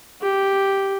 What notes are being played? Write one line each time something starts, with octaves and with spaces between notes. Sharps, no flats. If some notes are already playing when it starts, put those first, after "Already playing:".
G4